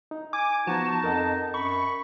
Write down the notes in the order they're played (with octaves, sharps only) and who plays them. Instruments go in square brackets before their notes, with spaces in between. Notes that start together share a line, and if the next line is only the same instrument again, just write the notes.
[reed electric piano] D#4
[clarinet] G#5 [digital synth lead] D6
[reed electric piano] F3 B3 [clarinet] D#4 [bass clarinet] F#4 [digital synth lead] A5
[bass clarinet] F2 [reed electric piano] A#4 D#5 F#5
[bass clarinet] F#2 [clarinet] B5 [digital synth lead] C#6